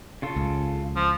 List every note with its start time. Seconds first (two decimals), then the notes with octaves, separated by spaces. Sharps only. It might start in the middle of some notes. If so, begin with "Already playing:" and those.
0.22 C#3 F4 A4
0.36 C#2
0.96 F3